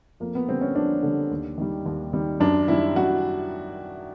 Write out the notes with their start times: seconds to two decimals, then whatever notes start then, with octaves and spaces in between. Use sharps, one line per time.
0.20 F2 A#3
0.35 B3
0.48 D3 G3 C4
0.61 C#4
0.75 F2 D4
1.03 D3 G3
1.31 D#2
1.58 D#3 G3
1.86 D#2
2.13 D#3 G3
2.40 F#2 D4
2.68 D#3 G3 E4
2.96 F#2 F#4